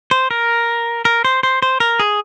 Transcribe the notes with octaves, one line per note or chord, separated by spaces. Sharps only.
C5
A#4
A#4
C5
C5
C5
A#4
G#4